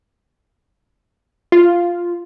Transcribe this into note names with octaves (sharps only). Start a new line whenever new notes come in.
F4